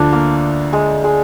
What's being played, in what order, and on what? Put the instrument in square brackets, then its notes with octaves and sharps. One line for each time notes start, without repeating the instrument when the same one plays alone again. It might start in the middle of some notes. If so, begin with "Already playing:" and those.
Already playing: [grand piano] D2 D3 F3 [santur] D4
[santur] A#3
G#3
G#3